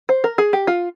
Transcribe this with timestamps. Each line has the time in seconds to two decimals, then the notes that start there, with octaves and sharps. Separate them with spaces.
0.09 C5
0.24 A#4
0.38 G#4
0.53 G4
0.67 F4